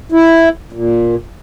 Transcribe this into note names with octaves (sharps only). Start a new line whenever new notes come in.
E4
A#2